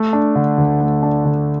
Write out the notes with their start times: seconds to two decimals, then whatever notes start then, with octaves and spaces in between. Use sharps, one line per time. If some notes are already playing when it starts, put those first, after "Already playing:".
Already playing: A3
0.13 D4
0.35 D3
0.58 D2
0.81 A3
1.03 D4
1.25 D3